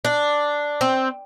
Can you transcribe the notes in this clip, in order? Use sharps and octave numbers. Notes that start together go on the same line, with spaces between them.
D4
C4